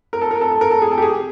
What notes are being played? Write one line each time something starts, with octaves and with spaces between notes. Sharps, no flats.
A#4
A4
A#4
A4
A4
A#4
A4
G#4
A4
G4
G#4